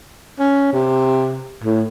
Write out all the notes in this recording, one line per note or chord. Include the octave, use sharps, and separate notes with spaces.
C#4
C3
A2